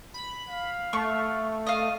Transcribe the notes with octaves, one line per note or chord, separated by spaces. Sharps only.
B5
F5
A3 C#6
D#5 F5